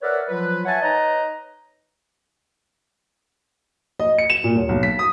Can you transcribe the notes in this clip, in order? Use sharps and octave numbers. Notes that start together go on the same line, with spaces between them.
A#4 B4 C#5 D5 E5 F#5
F3 F#3 F4 B4
B4 C#5 E5 F#5 G#5 A5
D#4 B4 C#5 D#5 A#5
D#5
C#7
E7
A#2
D#1
B1
B6
D#6